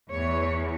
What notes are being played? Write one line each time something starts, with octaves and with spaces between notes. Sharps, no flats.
E2 E3 C#5